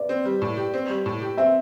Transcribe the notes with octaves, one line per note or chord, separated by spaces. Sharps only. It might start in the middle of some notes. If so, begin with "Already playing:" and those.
Already playing: B4 D5
C4
G3
A2
G4
C4
G3
A2
G4
C4 E5